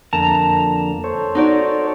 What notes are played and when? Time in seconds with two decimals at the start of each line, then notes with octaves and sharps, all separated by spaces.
0.13 F2 D3 A#3 A5 A#5
1.04 A4 C5 C#5
1.35 D#4 F#4 D5